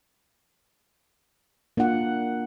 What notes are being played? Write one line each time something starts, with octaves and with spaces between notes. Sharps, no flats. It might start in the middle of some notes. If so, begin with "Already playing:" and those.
A#3 D4 F4 F#5